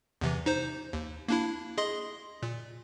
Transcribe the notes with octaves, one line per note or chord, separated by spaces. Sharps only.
E2 C3 E3
D#4 C5
D#2
A#3 D4 E4
G#4 D#5 C6
A#2